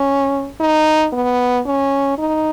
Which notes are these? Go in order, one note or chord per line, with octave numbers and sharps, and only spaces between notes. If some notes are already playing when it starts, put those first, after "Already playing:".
Already playing: C#4
D#4
B3
C#4
D#4